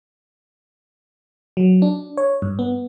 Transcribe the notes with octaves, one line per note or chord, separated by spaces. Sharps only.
F#3
D4
C#5
G2
B3